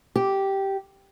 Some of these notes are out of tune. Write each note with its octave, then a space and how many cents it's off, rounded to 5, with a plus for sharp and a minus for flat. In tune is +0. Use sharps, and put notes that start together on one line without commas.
G4 -10